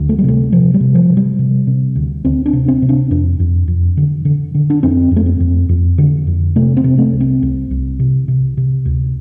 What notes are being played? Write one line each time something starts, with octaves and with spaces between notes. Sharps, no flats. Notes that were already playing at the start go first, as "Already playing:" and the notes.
Already playing: D2
A3
G3
C3 A3
C3 F3
G3
C3
F3
C3
G3
C3
C3
D2
D2 C4
D4
C3
C4
C3
D4
F2 D4
F2
F2
D3
D3
D3
D4
F2 C4
F2
A3
C4
F2
F2
D3
F2
C3 A3
C4
C3
A3
C2
C4
C2
C2
C3
C3
C3
D2